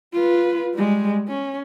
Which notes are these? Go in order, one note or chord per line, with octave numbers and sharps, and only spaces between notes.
F4 B4
G3 G#3
C#4